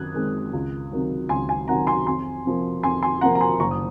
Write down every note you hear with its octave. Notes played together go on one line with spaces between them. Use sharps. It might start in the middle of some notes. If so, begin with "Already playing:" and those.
Already playing: F#2 D#3 C4 D#6 F#6 G#6
D#3 G#3 C4
C#2
C3 D#3 F#3
C#2 G#5 C6
G#5
C3 D#3 F#3 F#5 A#5
G#5 C6
F2 G#5 C6
C3 F3 A#3
F2 G#5 C6
G#5 C6
C3 F3 A#3 F#5 A#5
A#5
G#5 C6
F#1 A#5 C#6
D#6